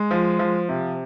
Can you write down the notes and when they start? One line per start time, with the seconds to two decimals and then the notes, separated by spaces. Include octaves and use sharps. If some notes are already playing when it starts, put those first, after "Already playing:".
Already playing: G#3
0.11 F3
0.39 F3
0.69 C3